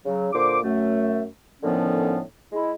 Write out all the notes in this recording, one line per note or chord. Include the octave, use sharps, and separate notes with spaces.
C#3 F#3
A#2 D3 C5 D6
F#2 A3
A2 D3 D#3 F3 B3 C#4
G#3 E4